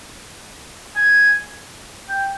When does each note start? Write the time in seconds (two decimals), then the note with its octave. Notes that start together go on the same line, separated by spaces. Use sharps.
0.96 G#5
2.09 G5